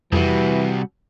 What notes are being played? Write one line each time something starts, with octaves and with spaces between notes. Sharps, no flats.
C2 F2 C3 E3 G3 F#4